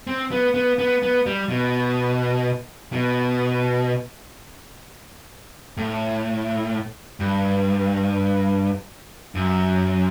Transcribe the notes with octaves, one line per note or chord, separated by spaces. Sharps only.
C4
B3
B3
B3
B3
G3
B2
B2
A2
G2
F#2